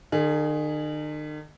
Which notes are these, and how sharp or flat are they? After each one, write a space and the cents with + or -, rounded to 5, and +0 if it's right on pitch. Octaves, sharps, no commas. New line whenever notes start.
D#3 -45 G#4 +0